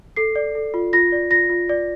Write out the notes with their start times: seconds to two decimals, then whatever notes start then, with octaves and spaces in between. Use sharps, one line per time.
0.16 A4 C7
0.36 D5
0.55 A4
0.74 F4
0.93 F4 A#6
1.12 D5
1.31 F4 A#6
1.50 F4
1.69 D5